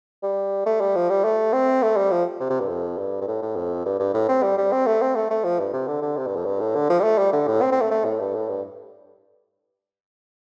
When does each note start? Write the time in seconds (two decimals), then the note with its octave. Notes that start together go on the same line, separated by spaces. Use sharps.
0.23 G3
0.66 A3
0.81 G3
0.96 F3
1.10 G3
1.24 A3
1.53 C4
1.82 A3
1.97 G3
2.11 F3
2.40 C3
2.50 C3
2.60 G2
2.69 F2
2.98 G2
3.21 G2
3.27 A2
3.42 A2
3.56 F2
3.86 G2
3.99 G2
4.14 A2
4.29 C4
4.43 G3
4.58 G3
4.72 C4
4.86 A3
5.02 C4
5.15 A3
5.30 A3
5.44 F3
5.59 G2
5.73 C3
5.88 D3
6.02 D3
6.17 C3
6.27 G2
6.36 F2
6.46 G2
6.60 A2
6.75 D3
6.90 F3
7.00 G3
7.04 A3
7.18 G3
7.33 D3
7.47 A2
7.62 C4
7.72 C4
7.81 A3
7.91 A3
8.05 A2
8.20 G2
8.35 A2
8.49 G2